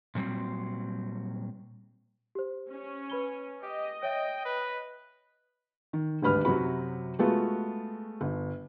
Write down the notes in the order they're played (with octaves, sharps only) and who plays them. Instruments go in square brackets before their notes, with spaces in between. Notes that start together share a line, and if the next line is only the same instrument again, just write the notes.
[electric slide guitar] A#2 F#3 G3 C4
[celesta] G4 C5
[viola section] C#4
[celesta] B4 B5 G7
[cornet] G4 [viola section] D#5
[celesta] C#5 E5 [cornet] G5
[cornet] B4
[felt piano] D#3
G#1 D2 G2 B4 B5 F6
F#2 C3 F#3 C4 F#4 B5
G#3 A3 B3 F4 F#4
G1